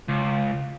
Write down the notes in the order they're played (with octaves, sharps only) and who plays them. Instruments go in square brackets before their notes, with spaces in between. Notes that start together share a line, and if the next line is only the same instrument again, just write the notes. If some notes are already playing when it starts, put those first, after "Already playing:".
[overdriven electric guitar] C#2